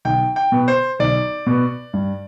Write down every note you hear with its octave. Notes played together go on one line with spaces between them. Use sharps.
B1 G5
G5
B2 B3
C5
B1 D5
B2 B3
G2